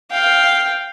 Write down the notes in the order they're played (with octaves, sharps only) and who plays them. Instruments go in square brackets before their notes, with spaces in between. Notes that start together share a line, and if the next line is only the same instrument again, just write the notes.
[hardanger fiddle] F5 G5